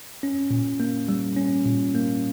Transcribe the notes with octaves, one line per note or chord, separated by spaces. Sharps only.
C#4
A#2
A#3
G3
C#4
A#2
A#3